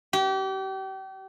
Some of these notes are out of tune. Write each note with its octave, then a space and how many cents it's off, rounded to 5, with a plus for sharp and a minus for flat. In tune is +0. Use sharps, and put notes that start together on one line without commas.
G4 -35